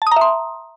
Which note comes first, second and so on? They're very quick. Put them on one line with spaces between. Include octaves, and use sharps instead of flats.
A5 D#6 A#5 E5 C6